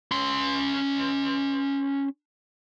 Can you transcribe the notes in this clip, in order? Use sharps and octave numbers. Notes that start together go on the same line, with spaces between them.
C#4 C6